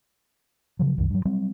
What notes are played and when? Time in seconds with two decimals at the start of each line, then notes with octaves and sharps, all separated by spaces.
0.79 C#3 F3 F#3
0.98 C2 F#2 D#3
1.10 G2 F#3
1.25 F#3 G3 C4